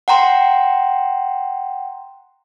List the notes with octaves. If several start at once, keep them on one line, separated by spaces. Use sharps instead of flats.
F#5 G5 A#5 C6